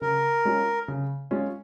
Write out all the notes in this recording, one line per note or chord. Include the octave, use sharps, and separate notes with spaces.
C#3 A#4
G#3 C#4 F4
C#3
G#3 C#4 F4